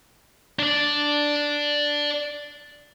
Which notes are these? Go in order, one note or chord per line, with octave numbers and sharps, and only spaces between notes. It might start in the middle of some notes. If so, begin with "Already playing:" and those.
D4 D5